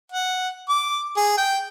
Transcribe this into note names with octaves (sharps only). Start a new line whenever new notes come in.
F#5
D6
G#4
G5